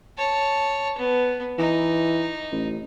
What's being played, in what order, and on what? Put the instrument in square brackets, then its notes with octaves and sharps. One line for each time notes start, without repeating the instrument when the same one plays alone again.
[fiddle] C#5 A5
B3
[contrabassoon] E3 [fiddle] D#4
[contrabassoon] A1